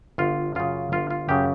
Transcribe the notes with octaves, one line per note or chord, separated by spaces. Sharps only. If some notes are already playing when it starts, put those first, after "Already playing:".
G1 F4
F#2 C#3 F4
G1 F4
F4
F#2 C#3 G4